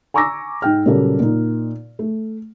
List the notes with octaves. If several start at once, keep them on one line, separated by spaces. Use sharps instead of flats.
G#5 A#5 C#6 D6 E6 A#6
G#2 G5 F6
A#2 C#3 F#3 G3 A#3 A4
A#2 D#4
A3